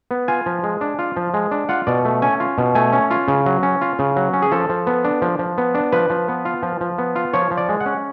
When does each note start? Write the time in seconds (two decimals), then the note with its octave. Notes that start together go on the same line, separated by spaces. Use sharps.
0.11 B3
0.28 F4 G#5
0.46 F3
0.63 G#3
0.81 D4
0.99 F4
1.17 F3
1.34 G#3
1.51 D4
1.69 F4 F#5
1.87 B2 D5
2.05 A3
2.22 C#4 G#5
2.40 F4
2.58 B2
2.75 A3 G#5
2.92 C#4
3.11 F4
3.28 C#3
3.46 F#3
3.63 C#4
3.81 F4
3.99 C#3
4.16 F#3
4.33 C#4
4.42 G#4
4.52 F3 A4
4.69 F3
4.87 B3
5.05 D4
5.22 F3
5.39 F3
5.58 B3
5.75 D4
5.92 F3 B4
6.10 F3
6.28 B3
6.45 F4
6.63 F3
6.81 F3
6.98 B3
7.16 F4
7.33 F3 C#5
7.51 F3
7.57 D5
7.69 G#3
7.80 F#5
7.86 C#4